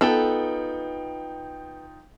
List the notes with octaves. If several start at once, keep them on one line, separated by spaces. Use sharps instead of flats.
B3 D#4 F4 A4 G5